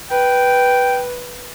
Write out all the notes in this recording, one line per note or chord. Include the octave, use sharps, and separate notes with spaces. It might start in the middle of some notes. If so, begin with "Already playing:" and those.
B4 G5